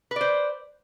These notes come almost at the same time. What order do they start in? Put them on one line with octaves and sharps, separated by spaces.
B4 D5 C5